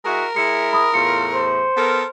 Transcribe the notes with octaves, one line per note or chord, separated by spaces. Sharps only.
G#3 E4 F#4 A#4
G#3 E4 C#7
B5 D#6
E2 A2 F4 C#7
C5
B3 A4 A#4